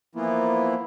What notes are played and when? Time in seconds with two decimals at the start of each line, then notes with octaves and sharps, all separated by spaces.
0.15 E3 F3 A#3 B3 E4 F4